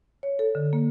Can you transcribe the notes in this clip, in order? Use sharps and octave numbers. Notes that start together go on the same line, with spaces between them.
C#5
A4
D3
A#3